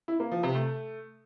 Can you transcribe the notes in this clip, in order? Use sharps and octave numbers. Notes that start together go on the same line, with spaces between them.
E4
A#3
F3
C3
A3